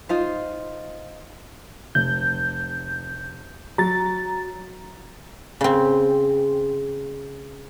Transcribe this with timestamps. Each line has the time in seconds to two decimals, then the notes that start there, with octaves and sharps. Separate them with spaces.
0.09 D#4 F4 C5
1.95 F1 G6
3.78 F#3 A#5 A6
5.61 C#3 C4